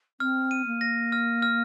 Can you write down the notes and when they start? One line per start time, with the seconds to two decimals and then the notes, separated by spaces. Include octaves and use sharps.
0.20 C4 F6
0.51 D#7
0.66 A#3
0.81 A#6
1.12 F6
1.42 F6